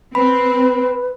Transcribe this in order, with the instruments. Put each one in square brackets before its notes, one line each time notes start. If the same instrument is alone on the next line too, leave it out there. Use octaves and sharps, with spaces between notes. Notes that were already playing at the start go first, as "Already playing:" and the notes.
[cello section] C4 [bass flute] B4 [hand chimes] B5